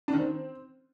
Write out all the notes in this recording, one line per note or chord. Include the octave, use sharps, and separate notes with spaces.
D4
D#3
C4